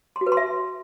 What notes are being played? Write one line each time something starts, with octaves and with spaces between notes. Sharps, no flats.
C6
F#4
B4
C6
E5